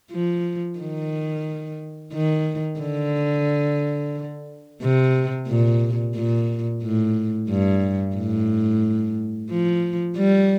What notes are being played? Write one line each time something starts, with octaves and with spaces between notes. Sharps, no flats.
F3
D#3
D#3
D3
C3
A#2
A#2
A2
G2
A2
F3
G3